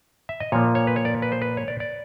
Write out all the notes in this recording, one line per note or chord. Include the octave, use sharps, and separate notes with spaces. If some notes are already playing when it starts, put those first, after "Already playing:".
E5
D#5
A#2 F3 A#3 C#5
C#5
B4
C#5
D5
B4
C5
B4
C#5
D5
D5